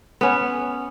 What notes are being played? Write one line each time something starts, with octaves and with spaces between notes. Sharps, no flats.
B3 C#4